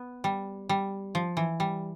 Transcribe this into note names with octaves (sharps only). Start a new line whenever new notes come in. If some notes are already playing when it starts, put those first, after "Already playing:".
Already playing: B3
G3
G3
F3
E3
G3